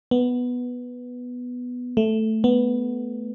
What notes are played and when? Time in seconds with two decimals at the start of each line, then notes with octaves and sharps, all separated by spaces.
0.11 B3
1.97 A3
2.44 B3